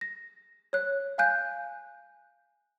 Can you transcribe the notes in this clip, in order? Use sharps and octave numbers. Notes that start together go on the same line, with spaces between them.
A#6
C#5 F#6
F5 G#5 F#6 G6